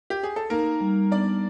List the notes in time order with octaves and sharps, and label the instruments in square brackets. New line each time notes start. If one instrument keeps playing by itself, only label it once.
[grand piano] G4
G#4
A4
[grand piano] A#3 A#4 [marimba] D#4
[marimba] G3
[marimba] B3 [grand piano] D4 D5